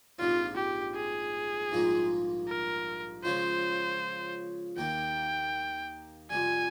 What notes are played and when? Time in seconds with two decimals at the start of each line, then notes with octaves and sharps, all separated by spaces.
0.19 A#1 G#2 G3 C4 F4
0.57 G4
0.96 G#4
1.71 A#1 G#2 G3 A#3 F4
2.48 A#4
3.24 C#3 F3 G#3 C#4 F4 C5
4.77 D#2 D#3 A#3 G5
6.30 F2 C3 G3 G#5